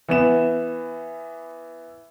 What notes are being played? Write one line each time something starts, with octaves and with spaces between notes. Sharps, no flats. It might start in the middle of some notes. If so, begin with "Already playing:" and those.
E3 B3 E7